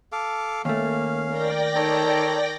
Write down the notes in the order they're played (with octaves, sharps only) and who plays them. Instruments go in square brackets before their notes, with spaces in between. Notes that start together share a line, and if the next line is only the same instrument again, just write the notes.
[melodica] A4 F5 D6
[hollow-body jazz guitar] D#2 A3 [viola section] A#3 [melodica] C#4 F5
[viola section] A#4 [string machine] D5 G5 A#6
[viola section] D#3 [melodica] A4 C#5 A#5